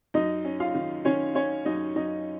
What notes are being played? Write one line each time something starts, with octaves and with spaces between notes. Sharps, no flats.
F#2 D#4 D#5
C#4
F4 F5
D#3
D#3 C#4 C#5
C#4 C#5
F#2 D#4 D#5
F#2 D#4 D#5